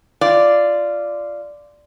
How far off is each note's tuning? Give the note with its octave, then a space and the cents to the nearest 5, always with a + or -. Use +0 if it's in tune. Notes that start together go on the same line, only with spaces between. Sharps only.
F4 -15 D5 +0